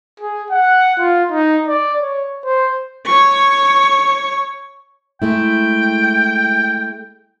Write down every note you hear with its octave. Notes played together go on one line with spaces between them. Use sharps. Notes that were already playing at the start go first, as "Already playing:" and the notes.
G#4
F#5
F4
D#4
D5
C#5
C5
C#5 C#6
G#3 A3 E4 G5